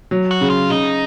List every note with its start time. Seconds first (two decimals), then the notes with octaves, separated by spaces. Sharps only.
0.11 F#3
0.31 F#4
0.41 C#3
0.50 F4
0.70 C#3 D#4